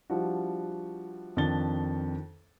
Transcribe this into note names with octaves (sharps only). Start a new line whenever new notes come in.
F3 G3 D4 E4 F#4
F2 D#3 D4 F4 A6 G7